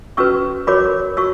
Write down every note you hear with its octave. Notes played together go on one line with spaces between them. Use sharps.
C#4 F#4 B4 C#6 E6
F#4 A#4 C#5 B5 D6
F#4 C#6 E6